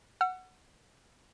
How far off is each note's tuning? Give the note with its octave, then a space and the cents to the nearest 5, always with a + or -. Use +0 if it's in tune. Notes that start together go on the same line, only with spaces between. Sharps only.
F#5 +0 E6 +45